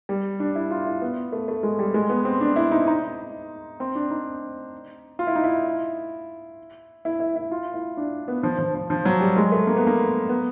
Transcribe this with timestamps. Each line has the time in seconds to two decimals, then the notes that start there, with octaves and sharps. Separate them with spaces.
0.09 G3
0.40 D4
0.55 E4
0.71 F4
0.86 E4
1.02 B3
1.32 A3
1.48 A3
1.63 G#3
1.79 G3
1.94 G#3
2.10 B3
2.25 C4
2.41 D4
2.56 E4
2.71 D#4
2.87 D#4
3.80 C4
3.95 D4
4.10 D#4
5.19 F4
5.27 E4
5.35 D#4
5.44 E4
7.05 E4
7.20 E4
7.36 E4
7.52 F4
7.74 E4
7.97 D4
8.28 B3
8.43 F3
8.59 F3
8.75 F3
8.90 F3
9.05 F#3
9.21 G3
9.37 G#3
9.52 A3
9.67 A#3
9.77 B3
9.87 A#3
10.29 B3